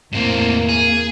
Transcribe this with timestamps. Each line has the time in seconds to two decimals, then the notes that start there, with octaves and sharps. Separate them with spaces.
0.13 E2 A2 A#3 C4
0.69 G#4